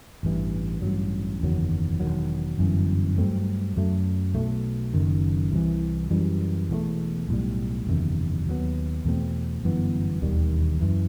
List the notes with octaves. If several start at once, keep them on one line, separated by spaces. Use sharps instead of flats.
A1 G2 E3
A1 G2 F#3
F#1 E2 D#3 F#3
E1 E2 D#3 F#3
G1 F#2 E3
G2 F#3 A3 C4
F#2 F#3 A3
B1 B2 A3
F#1 F#2 D#3
C2 C3 E3
F#2 E3 G3
E1 E2 D#3 A3
B1 A2 G3
F#1 E2 C3 D#3
D#2 D#3 F#3 B3
E2 B2 A3 C4
G1 F#2 E3 B3
E1 D#2 D#3 G3
F#2 E3